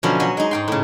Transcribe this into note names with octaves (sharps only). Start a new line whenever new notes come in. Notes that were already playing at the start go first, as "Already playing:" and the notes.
B2 D3 F3 F#3 B3 C#4
F#3 C#5 D#5 C6
G#3 D#4
G#2 G5 C6
A2 C#3